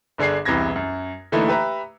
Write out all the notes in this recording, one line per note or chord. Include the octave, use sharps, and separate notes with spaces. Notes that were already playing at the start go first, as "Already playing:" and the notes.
G1 D3 D4 G#4 C7
E1 C2 C3 E3 G#6 A#6
F#2
D3 E3 A3 A#3 D#4 E4
G4 B4 E5 A#5